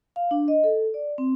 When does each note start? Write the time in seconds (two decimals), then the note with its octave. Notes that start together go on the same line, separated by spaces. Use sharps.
0.16 F5
0.31 D4
0.48 D#5
0.64 A4
0.94 D5
1.18 C4